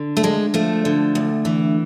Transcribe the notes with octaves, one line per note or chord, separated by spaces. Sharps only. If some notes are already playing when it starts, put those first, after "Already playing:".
Already playing: D3
A3
D2 G#3
F3 A3
D3
D2
E3